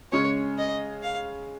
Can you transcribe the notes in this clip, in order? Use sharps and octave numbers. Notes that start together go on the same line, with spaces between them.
C#3 G#3 C#4 C#5
D#5
F5